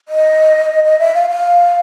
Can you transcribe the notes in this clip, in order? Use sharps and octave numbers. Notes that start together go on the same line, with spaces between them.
D#5
D#5
E5
F5
F5